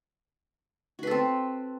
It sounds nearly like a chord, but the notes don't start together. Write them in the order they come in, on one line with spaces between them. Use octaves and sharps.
F#4 B4 A4 C4